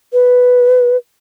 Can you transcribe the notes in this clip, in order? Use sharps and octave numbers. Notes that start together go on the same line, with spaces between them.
B4